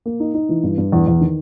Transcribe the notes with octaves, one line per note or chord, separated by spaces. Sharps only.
A#3
D#4
D#4
E3
G2
G2
E2
E2
D#3